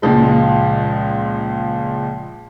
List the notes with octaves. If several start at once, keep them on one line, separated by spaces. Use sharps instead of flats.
C#2 A#2 F3 G#3